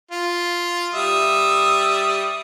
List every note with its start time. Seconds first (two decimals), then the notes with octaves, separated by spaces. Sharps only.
0.11 F4
0.94 G3 E5 D#6